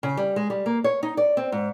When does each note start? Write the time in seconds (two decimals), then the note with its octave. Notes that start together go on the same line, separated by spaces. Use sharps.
0.03 C#3
0.17 G3
0.36 G#3
0.50 G3
0.66 A#3
0.84 C#5
1.03 D#4
1.17 D5
1.37 C4
1.52 G#2